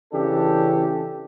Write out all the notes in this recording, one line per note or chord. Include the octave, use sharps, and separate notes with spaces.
C#3 E3 D4 G4 A4